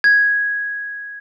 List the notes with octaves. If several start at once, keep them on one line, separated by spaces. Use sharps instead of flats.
G#6